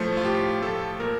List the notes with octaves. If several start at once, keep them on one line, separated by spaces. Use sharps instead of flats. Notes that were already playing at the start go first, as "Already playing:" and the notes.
Already playing: A2 F3 A3 C5
F4
A2 G4
A3 A4
F3
A#2 A#4